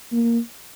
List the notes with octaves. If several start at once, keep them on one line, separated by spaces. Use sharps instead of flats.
A#3